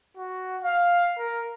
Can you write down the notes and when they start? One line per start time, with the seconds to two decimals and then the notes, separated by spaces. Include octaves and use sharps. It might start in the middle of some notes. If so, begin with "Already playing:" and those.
0.17 F#4
0.64 F5
1.18 A#4